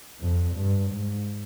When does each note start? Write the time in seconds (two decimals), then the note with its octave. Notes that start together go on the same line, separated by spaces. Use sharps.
0.20 F2
0.54 G2
0.90 G#2